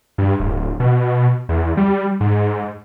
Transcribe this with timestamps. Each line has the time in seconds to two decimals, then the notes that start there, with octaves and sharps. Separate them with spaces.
0.18 G2
0.40 D1
0.80 B2
1.49 E2
1.77 G3
2.20 G#2